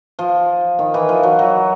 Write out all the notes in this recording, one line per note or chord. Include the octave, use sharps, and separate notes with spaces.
F3
D#3
E3
F3
F#3
F#3